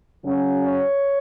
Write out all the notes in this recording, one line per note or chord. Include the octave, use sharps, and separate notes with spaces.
F#2 C#3 F#3 C#4
C#5